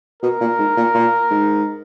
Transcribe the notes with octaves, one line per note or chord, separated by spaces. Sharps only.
B2 A#4
A#2
G#2
A#2
A#2
G#2